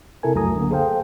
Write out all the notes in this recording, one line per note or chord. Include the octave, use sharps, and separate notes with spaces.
C3 E4 A4 A#4 G#5
C#2 F#2 F#3 A3 A#5 D#6
D3 A#3
G#4 A4 C5 F5 G5